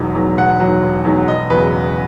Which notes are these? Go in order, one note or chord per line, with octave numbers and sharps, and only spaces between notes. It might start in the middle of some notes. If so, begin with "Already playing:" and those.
Already playing: E1 E2 D#3 F#3
E2 D#3 F#3
E1 F#5
E2 D#3 F#3
E1
E2 D#3 F#3
E1 D#5
E2 C#3 F#3 B4